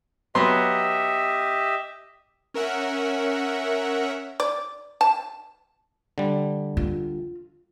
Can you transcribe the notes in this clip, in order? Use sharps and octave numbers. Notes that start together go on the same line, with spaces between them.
F#3 B3 G4 D#5 E5 C6
C#4 A#4 E5 F#5
D5
A5
D3 G3
F4